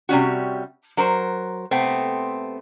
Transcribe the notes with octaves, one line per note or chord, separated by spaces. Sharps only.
C3 G3 C#4 F#4
F#3 A#4 C5
C3 A3 B3 C4